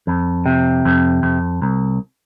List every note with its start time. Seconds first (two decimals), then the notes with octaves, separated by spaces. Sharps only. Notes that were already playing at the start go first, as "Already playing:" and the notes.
0.07 F2
0.46 C3
0.85 F2
1.23 F2
1.62 C2